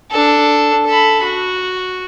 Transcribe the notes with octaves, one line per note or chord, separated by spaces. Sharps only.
D4 A4
A4 B5
F#4